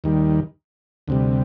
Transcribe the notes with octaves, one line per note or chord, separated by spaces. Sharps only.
D#2 D#3 G3
D2 C3 G3